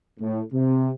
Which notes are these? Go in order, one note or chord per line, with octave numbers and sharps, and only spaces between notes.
A2
C3